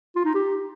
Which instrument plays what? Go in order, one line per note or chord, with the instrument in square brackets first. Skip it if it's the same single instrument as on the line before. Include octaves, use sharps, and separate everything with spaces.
[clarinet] F4
D#4
G4